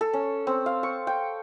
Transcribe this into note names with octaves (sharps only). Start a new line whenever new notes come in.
A4
C#4
C4
F5
C#6
G5